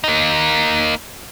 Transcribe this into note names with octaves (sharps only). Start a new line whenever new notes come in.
A#3 D#4